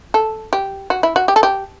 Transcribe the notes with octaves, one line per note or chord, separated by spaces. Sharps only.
A4
G4
F#4
E4
F#4
G4
A4
G4